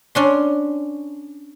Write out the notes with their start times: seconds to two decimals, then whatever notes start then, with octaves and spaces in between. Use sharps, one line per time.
0.15 C#4 D4 C6